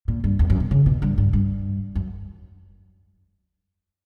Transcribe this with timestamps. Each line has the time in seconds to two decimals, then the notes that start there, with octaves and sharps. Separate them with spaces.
0.08 A#2
0.24 G2
0.39 E2
0.50 F#2
0.60 B2
0.71 C#3
0.86 B2
1.02 G2
1.18 G2
1.33 G2
1.95 F#2